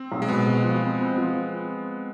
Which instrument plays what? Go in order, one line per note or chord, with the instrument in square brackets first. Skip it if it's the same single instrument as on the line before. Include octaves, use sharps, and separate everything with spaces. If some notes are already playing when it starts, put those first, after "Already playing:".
Already playing: [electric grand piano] C4
[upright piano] B1
[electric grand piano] G#3
[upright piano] B2 [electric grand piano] B3
[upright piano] B2
F3
C4
C4
F3